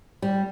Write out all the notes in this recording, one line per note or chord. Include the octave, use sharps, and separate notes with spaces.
G3